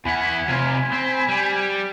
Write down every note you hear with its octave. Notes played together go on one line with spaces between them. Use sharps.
E2 F#5 G#5 B5
C3 F4
C4
G3